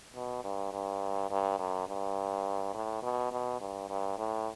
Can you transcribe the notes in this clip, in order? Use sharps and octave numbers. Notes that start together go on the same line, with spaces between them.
B2
G2
G2
G2
F#2
G2
A2
B2
B2
G2
G2
A2